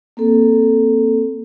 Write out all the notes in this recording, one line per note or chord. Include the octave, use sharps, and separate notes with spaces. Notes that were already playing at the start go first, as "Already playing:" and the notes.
A#3 C4 A4